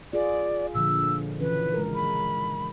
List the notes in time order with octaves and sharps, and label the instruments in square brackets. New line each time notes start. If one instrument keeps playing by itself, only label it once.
[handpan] F4 G#4 [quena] D5
[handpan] A#2 D3 F3 [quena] E6
[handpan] C#3 E3 C#4 [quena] B4
[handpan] G#3 A#4
[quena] B5